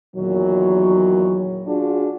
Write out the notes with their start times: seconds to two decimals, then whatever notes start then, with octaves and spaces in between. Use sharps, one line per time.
0.15 E2 A#2 D#3 F#3
1.66 D4 F4 F#4 G#4 D5